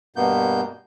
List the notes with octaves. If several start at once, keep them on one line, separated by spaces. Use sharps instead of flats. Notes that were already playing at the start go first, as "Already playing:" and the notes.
G2 B2 A#3 B3 G6